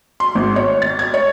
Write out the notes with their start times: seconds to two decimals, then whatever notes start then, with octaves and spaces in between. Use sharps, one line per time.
0.20 C6
0.35 G#1
0.56 C#5
0.82 A6
0.99 G#6
1.14 C#5